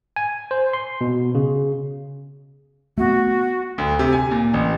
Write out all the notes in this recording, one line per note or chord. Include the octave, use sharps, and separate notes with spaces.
G#5
C5
C6
B2
C#3
A3 B3 F#4
D2
C3
G#5
A#2
A1